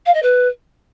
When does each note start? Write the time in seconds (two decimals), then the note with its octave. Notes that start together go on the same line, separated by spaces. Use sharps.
0.06 F5
0.14 D#5
0.23 B4